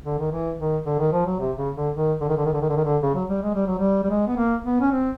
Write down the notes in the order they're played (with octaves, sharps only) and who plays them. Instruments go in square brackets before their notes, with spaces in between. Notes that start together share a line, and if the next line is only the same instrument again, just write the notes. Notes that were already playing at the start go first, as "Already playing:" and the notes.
[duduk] D3
D#3
E3
D#3
D3
D#3
F3
F#3
C3
C#3
D3
D#3
D3
D#3
D3
D#3
D3
D#3
D3
D#3
D3
C#3
F#3
G3
G#3
G3
F#3
G3
G3
G#3
B3
A#3
B3
C#4
C4